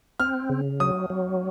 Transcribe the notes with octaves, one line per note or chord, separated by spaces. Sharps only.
C4 F6
C#3
F#3 D#6
F#3